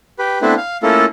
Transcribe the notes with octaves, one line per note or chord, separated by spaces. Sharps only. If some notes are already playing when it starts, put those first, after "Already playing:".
G4 B4
A3 B3 C4 D4 E4 B4
F5
A3 A#3 C#4 E4 F4 A4